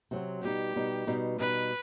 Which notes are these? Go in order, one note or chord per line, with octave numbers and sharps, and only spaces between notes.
C3 F#3 C4 F#4
B2 G3 D#4 G4
B2 G3 D#4
B2 G3 D#4
B2 G3 D#4 B4